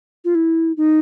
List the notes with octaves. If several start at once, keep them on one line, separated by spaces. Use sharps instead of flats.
F4
E4
D#4